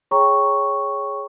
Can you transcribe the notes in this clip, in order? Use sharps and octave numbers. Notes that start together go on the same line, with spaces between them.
G#4 C#5 G5 A#5 C#6